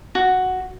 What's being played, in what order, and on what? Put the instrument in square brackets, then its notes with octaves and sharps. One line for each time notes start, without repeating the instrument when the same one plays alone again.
[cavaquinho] F#4